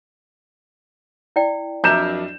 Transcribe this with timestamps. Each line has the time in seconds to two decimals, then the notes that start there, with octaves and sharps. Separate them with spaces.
1.36 E4 D5 G5
1.84 F2 F#3 D4 A#4 E5 G6 E7